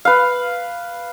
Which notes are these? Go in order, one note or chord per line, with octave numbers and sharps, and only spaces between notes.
B4 F5